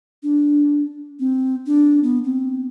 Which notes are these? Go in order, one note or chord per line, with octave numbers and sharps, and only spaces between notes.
D4
C4
D4
B3
C4